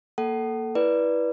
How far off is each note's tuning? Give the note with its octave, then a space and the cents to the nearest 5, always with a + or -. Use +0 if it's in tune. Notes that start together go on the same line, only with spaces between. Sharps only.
A#3 +0 A4 +0 F#5 +35
E4 +0 B4 -15 D5 +0